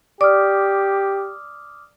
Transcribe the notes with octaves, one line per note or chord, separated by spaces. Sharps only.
G4 D5 D6 D#6 F6